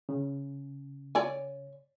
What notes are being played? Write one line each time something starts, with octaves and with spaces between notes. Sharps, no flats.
C#3
C#5 D5 G#5